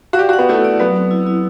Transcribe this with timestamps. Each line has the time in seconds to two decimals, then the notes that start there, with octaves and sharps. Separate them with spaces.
0.13 F#4
0.19 G4 D5
0.29 F#4
0.33 F#5
0.39 B3
0.49 A3 E4
0.64 D5
0.80 F#3 B3
0.96 C4
1.11 E4
1.26 E4